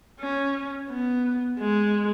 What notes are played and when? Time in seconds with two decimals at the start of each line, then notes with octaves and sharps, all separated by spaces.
0.20 C#4
0.89 B3
1.59 G#3